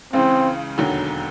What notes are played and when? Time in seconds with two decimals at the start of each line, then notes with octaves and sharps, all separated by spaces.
0.13 C#2 C#3 E3 C4
0.77 E1 D#2 D3 F#3